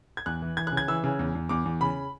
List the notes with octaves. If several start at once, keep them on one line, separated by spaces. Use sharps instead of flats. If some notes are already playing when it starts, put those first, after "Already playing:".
G#6
E2 F#6
E3
E3 G#6
C#3 F#6
G#6
E3 E6
C#3
E2
E2
E2 D6
E2
C#3 B5